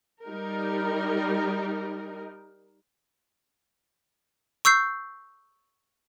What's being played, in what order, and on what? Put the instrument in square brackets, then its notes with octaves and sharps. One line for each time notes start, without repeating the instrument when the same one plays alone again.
[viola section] G3 D#4 A#4
[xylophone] C#6 E6 G6 C7